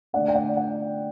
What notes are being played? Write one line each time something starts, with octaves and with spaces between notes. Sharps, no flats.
D3 A3 D4 D5 F#5
G5
D5 F#5
D5 F#5